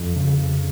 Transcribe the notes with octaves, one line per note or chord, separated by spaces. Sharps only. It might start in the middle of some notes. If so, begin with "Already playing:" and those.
Already playing: F2
C#3